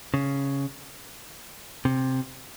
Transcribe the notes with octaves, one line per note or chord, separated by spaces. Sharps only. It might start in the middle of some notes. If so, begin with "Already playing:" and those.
C#3
C3